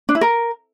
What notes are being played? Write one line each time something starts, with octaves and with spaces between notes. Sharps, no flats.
D4
E4
A#4